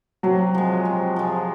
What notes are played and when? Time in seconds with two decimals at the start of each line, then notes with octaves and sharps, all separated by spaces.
0.23 C3 F#3
0.54 F3 G#3
0.85 C3
1.16 F3 G#3